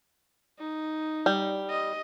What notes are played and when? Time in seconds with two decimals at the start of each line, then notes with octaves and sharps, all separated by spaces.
0.60 D#4
1.26 G3
1.70 D#5